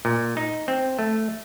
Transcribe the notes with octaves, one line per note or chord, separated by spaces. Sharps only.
A#2
D#4
C4
A3